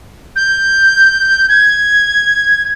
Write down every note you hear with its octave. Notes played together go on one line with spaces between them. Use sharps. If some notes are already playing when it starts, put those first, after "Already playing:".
G6
G#6